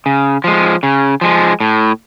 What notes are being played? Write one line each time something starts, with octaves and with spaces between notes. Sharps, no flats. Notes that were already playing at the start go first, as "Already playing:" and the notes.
C#3
F3 G#3
C#3
F3 G#3
A2